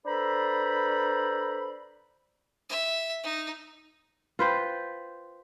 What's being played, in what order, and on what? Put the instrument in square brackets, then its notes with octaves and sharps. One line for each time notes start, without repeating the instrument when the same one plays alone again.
[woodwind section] D4 A4 B4 C5 A#5 B5
[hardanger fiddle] E5
D#4
[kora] F4 B4 C5 G5